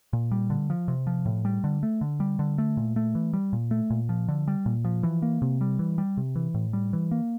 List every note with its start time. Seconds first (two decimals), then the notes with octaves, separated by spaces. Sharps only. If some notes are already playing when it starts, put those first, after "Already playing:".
0.13 A#2
0.31 G3
0.50 D3
0.70 F3
0.88 C3
1.07 F3
1.26 A2
1.45 G3
1.64 D3
1.83 A3
2.01 D3
2.20 G3
2.39 D3
2.58 A3
2.77 A#2
2.96 A3
3.15 E3
3.33 G3
3.53 A#2
3.71 A3
3.90 A#2
4.09 F3
4.28 D3
4.48 G3
4.66 A#2
4.85 F3
5.03 E3
5.22 A#3
5.42 C3
5.61 G3
5.79 E3
5.98 G3
6.17 C3
6.35 E3
6.54 A2
6.73 G3
6.93 E3
7.11 A#3